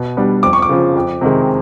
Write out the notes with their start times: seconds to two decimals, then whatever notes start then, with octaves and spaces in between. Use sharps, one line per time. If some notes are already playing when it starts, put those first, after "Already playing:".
Already playing: B2
0.17 G3 B3 D4
0.43 F2 D6
0.53 C#6
0.62 D6
0.69 C#3 F3
0.95 F2
1.21 C3 D#3 G#3